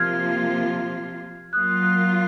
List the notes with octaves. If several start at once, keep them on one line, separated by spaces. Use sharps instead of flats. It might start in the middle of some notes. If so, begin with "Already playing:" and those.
Already playing: C3 F3 A#3 F4 F6 G#6
F#3 A#3 F4 D#6 F#6
D#6 F#6